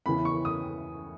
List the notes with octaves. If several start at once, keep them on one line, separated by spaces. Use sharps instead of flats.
E2 C#3 E3 B5
C#6
D#6